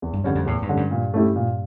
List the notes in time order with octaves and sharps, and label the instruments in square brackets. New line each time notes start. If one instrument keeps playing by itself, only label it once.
[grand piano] E2
[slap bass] G2
[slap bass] E2 [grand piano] D3 G3 C#4
[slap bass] F2
[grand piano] E2 [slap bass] A2
[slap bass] G2
[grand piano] D3 G3 C#4
[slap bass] G2
[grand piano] A#2
A3 C#4 E4 G4
A#2